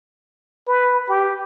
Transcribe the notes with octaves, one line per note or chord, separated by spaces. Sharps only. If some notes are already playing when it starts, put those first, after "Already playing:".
B4
G4